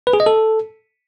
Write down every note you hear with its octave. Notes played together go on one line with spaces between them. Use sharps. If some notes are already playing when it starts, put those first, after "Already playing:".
B4
G#4
D#5
A4